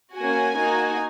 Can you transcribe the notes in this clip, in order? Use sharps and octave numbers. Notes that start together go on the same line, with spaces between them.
A#3 C#4 F#4 G#5
A#3 D#4 F#4